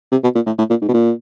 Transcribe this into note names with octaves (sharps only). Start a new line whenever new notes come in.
C3
B2
A#2
A2
A2
A#2
G#2
B2
A#2